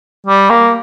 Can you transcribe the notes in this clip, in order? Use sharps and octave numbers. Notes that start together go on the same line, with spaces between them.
G3
A#3